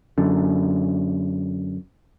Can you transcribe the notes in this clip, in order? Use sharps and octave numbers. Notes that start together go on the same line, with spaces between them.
F#2 D3